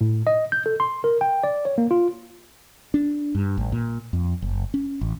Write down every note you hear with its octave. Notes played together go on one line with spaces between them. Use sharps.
A2
D#5
G6
A4
C6
A#4
G5
D5
C#5
A#3
F4
D4
G2
A1
A#2
F2
F#1
C#4
A1